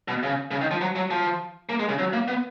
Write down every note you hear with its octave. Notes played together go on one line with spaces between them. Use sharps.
B2
C#3
C#3
D#3
F3
F#3
F#3
F3
A#3
G#3
C#3
F#3
A#3
B3